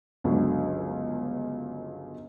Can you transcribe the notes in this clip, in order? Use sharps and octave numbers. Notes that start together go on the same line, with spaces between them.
G1 C#2 D3 F#3